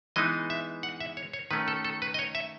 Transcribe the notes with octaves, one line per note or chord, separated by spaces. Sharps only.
E3 G#3 B3 D#4 D#5
E5
F#5
E5
C#5
C#5
D#3 A3 C#4 B4
A4
A4
B4
D#5
C#5
E5